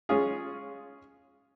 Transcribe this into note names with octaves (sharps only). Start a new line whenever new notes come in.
G#3 C#4 F4 G#4